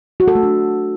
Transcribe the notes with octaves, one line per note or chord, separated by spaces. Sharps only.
F#4
A4
A3
D4